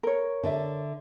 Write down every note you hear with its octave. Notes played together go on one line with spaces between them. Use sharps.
A#4 C#5
D3 D5 E5